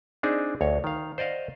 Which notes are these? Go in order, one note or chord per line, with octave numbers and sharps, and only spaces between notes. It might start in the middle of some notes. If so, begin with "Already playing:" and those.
C4 D4 D#4 G#4
D2 C#5
D#3 F5
C5 D5 D#5 F5 F#5